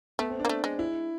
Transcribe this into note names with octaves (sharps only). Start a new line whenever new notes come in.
A3 B3
C4
D4
A#3
A3
G#3
E4